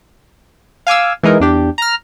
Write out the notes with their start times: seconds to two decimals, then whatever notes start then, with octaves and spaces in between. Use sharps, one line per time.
0.87 F5 G#5 D6 E6
1.23 E3 G#3 D#4 A#4
1.40 E2 D4 G4
1.78 A#5 F6